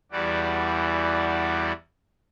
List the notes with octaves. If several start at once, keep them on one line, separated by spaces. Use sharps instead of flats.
E2 E3 G3 F#4 D5